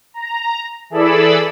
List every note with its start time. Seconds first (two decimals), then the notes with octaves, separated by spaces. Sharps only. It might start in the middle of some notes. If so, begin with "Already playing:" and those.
0.14 A#5
0.90 E3 G#4 A4 D5 B5 E6